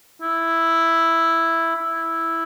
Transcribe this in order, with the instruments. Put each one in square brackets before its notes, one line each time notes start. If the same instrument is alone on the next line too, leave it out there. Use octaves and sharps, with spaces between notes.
[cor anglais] E4
E4